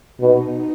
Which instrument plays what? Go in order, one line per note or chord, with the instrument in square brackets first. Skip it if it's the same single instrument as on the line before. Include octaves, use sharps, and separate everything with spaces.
[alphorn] B2 [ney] D#4